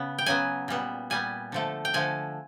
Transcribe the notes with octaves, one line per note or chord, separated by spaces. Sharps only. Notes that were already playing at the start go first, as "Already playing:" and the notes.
Already playing: C#3 B3
G5
C#3 F#3 B3 G#5
A#2 G3 B3
A#2 G3 B3 G#5
D3 F3 A3
G5
D3 F3 A3 G#5